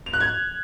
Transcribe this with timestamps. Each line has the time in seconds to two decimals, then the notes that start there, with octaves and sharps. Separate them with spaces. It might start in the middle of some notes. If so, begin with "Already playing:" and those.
0.06 F7
0.13 F#6
0.20 G#6